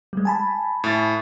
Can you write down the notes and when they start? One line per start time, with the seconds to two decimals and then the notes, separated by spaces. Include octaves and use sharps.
0.13 G3 G#3
0.25 G#5 A5 B5
0.84 A2 A6